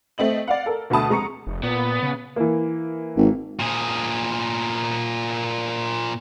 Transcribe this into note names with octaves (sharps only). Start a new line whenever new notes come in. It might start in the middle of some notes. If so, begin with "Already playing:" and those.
A3 C4 D#5 F#7
D5 F5 F#5
A4 A#4
D2 B2 A3 A5 D#6
F1 G#3 A#5 C#6 C#7
F1
A#2 B3
C#3
E3 A#3
G#1
A#2 G#4